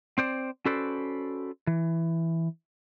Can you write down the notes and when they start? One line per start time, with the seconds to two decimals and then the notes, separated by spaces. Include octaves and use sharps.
0.18 C4 C5 D5
0.66 C#4 F#4 A4 B4 C5 D5
1.67 E3